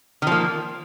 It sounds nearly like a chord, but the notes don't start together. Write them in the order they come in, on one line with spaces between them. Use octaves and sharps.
D#3 F3 A#3